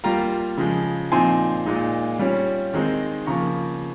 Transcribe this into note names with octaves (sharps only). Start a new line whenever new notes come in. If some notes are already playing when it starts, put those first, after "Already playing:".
G3 A#3 F4 G5 A#5
C#3 F3 G#3
A#2 F3 C4 D#4 G#5 C6
A#2 G#3 D#4
G3 C#4 F4
D#3 G#3 C4 D#4
C#3 F3 A#3 A#5 C#6